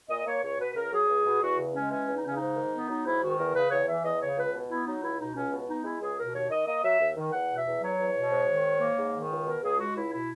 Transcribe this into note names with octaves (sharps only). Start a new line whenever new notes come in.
A#2 D#5
A#3 C#5
C#2 C#5
B2 B4
B4
C#2 A#4
F#3 G#4
C#2
B2
E2 F#4
C#3
G#3 C#4
E3 C#4
E2
D#4
C#3 C#4
G#2 D#4
D#3
B3
F#3 D#4
G#2 E4
D#3 F#4
E2 A#4
C#3 B4
E2 C#5
E3 E5
E2 D#5
C#3 C#5
C#2 B4
B2
B3 E4
F#3 D#4
C#2 E4
B2 D#4
C#2 C#4
B2
B3 D#4
G#3 E4
C#2 G#4
B2 A#4
D#2 C#5
D#3 D#5
A#3 D#5
F#3 E5
D#2
D#3
E2 F#5
B2
E5
E2
F#3 C#5
E2
B2
G#2
D#3
G#2
A#3
G#2
D#3
C#2
B2 A#4
C#2 G#4
G#3 F#4
C#2 E4
B2 E4